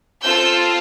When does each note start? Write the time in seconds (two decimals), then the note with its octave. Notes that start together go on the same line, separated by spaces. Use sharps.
0.22 C4 F4 A4 E6 G6